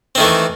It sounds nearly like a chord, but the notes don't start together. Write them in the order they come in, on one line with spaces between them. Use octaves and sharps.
C4 D#3 A3 E3